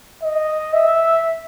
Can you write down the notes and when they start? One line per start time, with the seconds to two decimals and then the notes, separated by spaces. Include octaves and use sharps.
0.23 D#5
0.74 E5